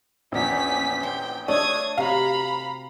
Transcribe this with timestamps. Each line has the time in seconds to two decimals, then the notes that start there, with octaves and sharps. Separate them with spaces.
0.32 A#1 E2 C#4 B6
1.03 C5 G5
1.48 A3 D4 C#5 D#6 G#6
1.98 C3 F#4 F5 A#5 B5